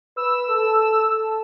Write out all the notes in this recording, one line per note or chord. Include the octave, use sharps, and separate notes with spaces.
B4 E6
A4
A4